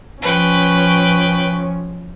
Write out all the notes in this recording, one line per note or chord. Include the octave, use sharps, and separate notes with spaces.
F3 C#4 B4 G5